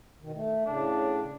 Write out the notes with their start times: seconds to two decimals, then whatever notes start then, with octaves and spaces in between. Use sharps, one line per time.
0.22 B2 D#3
0.35 A3
0.66 A2 C#3 D4